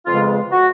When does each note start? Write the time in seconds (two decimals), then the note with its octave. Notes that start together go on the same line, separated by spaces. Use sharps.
0.06 F2 C#3 G#3 B3 F4
0.52 F#4